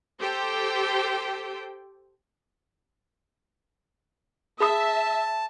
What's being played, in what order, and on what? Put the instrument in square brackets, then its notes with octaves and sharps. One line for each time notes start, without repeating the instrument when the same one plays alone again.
[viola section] G4 A4 C5 G5
[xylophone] G#4 B5 D#6 [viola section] E5 [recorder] A5